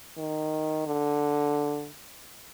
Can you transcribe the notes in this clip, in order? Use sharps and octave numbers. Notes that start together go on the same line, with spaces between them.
D#3
D3